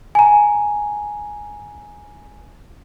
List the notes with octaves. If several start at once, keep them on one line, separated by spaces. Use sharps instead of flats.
G#5 A#5